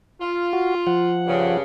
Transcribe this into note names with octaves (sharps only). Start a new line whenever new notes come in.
F4
F#4
F3 F#5
G2 C#3